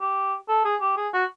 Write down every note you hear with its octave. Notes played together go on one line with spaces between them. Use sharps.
G4
A4
G#4
G4
G#4
F#4